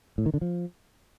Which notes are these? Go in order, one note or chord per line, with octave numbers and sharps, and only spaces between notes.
A2
D#3
D3
F3